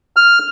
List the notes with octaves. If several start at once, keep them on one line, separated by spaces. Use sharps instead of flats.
F6